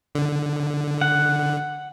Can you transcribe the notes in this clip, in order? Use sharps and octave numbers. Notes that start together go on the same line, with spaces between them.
D3
F#5